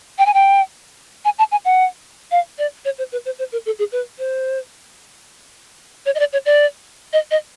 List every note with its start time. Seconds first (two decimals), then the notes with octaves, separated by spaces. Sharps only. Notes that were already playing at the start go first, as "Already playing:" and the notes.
0.18 G5
0.26 G#5
0.34 G5
1.25 G#5
1.39 A5
1.51 G#5
1.65 F#5
2.31 F5
2.58 D5
2.85 C#5
2.98 C5
3.12 B4
3.25 C5
3.39 C5
3.52 A#4
3.66 A4
3.79 G#4
3.92 B4
4.19 C5
6.06 C#5
6.15 D#5
6.19 D5
6.33 C#5
6.46 D5
7.13 D#5
7.31 D#5